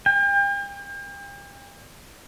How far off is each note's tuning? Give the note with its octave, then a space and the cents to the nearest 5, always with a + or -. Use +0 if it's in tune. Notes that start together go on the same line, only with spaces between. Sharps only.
G5 +40